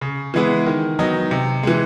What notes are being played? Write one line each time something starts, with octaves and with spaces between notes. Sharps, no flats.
C#3
E3 G#3 B3 E4
D#3
F#3 B3 D#4
C3
E3 G#3